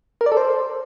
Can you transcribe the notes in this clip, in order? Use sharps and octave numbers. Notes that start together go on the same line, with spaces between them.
A#4
D5
A4
C5